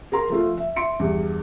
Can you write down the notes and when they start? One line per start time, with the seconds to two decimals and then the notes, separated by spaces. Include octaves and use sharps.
0.12 G#4 A#4 A#5 C6
0.30 F3 A3 F4
0.58 E5
0.76 E5 C6 C#7 D7
0.99 E2 G2